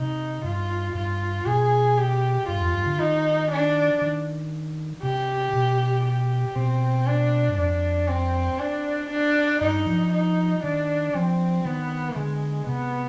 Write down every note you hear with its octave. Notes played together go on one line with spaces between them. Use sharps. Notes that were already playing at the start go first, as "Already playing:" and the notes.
Already playing: C3 D#4
G2 F4
G2 F4
B2 G#4
G4
G2 F4
F2
G2
D3
D#3 D#4
D4
D#3
C3 G4
B2
G4
B2 C4
D4
G2
F2 D4
C4
D4
D4
G2 D#4
F3
D#4
D#3 D4
F3 C4
D#3 B3
D3 G#3
C3 B3